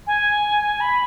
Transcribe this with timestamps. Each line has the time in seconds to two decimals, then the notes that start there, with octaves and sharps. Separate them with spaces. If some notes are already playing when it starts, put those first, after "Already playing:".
0.07 G#5
0.80 B5